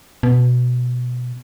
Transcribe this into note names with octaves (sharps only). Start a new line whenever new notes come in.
B2